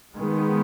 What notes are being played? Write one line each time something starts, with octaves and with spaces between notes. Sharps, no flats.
D#3 G#3 B3